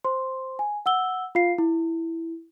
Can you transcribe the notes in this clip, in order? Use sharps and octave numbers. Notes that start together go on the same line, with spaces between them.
C5 C6
G#5
F#5 E6 G7
F4 F5 C7
E4